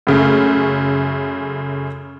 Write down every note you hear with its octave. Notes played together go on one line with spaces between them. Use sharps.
F#2 C#3 A3